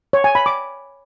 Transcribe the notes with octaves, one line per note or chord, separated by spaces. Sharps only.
C#5
G#5
B5
D6